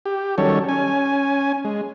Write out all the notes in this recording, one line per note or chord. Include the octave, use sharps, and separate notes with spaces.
G4
D#3 F#3 G3 C#4 A4 C#5
C#4 G#5
G#3